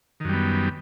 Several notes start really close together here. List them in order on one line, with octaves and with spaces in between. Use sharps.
D#3 F#2 G3 B3